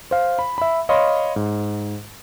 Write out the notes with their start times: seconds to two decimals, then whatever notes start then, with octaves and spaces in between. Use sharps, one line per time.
0.11 C5 F5
0.39 B5
0.58 E5 B5
0.89 C#5 D#5 F5 B5 C6
1.36 G#2